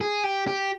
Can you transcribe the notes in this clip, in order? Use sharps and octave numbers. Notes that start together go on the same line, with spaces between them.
G#4
G4
G4